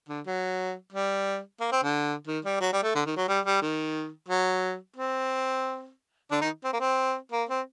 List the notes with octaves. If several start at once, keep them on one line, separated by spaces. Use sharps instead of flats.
D3
F#3
G3
A#3
C4
D3
D#3
G3
F#3
G3
A3
D3
D#3
F#3
G3
G3
D#3
F#3
C4
D3 D4
D#3 D#4
C4
A#3
C4
A#3
C4